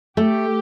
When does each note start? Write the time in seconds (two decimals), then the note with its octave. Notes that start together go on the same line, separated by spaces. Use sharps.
0.17 A3 G4